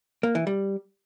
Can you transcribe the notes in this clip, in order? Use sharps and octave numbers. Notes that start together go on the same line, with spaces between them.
A#3
E3
G3